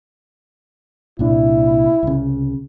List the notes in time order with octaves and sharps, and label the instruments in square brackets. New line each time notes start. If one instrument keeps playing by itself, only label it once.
[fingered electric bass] C2 A#2 D4 [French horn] E4
[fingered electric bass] C2 C#3